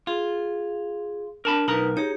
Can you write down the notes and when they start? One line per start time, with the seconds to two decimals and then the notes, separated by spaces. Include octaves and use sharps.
0.07 F4 G#4
1.45 D4 A#4 A5 B5
1.68 B1 D#4 A#4 B4 A#5
1.97 D#4 G4 G#4 C#5